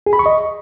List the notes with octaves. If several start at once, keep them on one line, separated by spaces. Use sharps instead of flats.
G#4
B5
C#6
D#5